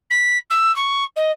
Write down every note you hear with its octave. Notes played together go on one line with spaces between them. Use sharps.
B6
E6
C#6
D#5